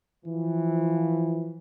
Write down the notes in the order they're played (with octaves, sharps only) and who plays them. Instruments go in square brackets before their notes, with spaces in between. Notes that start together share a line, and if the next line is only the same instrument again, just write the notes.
[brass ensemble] E3 F3